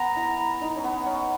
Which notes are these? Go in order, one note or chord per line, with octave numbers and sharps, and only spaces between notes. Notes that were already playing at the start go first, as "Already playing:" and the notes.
Already playing: B3 A#5
E4
D#4
C#4
B3
C#4